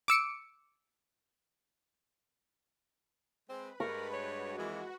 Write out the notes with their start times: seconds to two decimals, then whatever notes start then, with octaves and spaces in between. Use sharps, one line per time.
0.08 D6 E6 C#7 D7
3.49 G#3 C4 B4 B5
3.80 G2 G#3 A#4 C#6
4.13 F#4 C#5
4.58 F2 E3 G#3 A#3